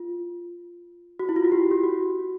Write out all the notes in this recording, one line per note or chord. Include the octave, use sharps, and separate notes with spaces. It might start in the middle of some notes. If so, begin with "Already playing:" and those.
Already playing: F4
F#4
E4
F4
F#4
G4
G4
F#4